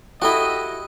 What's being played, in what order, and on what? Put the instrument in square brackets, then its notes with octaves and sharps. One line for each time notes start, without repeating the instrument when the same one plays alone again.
[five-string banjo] E4 F#4 [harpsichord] G4 A4 G5 [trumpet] D#5